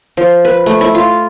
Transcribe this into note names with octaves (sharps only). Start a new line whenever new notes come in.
F3
B4
A3
E4
F4